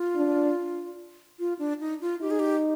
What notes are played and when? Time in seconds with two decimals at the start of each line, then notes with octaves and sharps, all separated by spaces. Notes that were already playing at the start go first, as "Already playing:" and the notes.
Already playing: F4
0.16 D4
1.39 F4
1.59 D4
1.80 D#4
2.01 F4
2.21 D#4 G4
2.31 G#4
2.39 G4